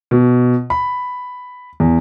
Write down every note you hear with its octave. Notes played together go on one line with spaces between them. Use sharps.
B2
B5
E2